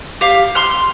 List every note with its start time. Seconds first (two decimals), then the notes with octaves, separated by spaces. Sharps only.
0.21 G4 F5
0.55 C6 F6